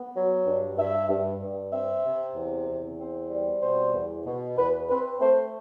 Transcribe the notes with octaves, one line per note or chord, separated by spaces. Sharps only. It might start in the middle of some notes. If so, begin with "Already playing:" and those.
Already playing: B3
F#3
G2
G2 E5
G2
G2
C4 E5
C3
E2
E2
C4
G3
B2 C5
E2
B2
E2 B4
C4 B4
A3 C5